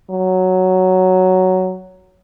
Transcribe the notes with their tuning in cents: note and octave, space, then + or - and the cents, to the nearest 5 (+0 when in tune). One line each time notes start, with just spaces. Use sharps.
F#3 +5